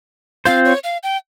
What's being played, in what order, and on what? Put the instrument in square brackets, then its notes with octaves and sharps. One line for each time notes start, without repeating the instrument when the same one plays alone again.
[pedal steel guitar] C4 F4 C5 [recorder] F5
[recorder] C#5
F5
G5